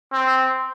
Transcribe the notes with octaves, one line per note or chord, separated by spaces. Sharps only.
C4